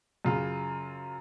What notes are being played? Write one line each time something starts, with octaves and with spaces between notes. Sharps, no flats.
F#2 C#3 F4